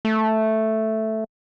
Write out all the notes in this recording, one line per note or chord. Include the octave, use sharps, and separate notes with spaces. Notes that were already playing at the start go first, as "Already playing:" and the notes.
A3